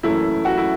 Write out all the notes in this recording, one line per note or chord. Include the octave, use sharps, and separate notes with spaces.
F#1 F#2 E3 A3 E4
F#4
E4